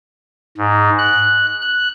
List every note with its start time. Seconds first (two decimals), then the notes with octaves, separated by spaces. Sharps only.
0.57 G#2
0.98 F#6
1.61 F#6